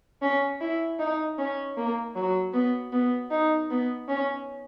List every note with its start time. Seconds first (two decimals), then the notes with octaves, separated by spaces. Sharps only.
0.22 C#4
0.61 E4
0.99 D#4
1.38 C#4
1.77 A#3
2.15 F#3
2.54 B3
2.92 B3
3.31 D#4
3.70 B3
4.09 C#4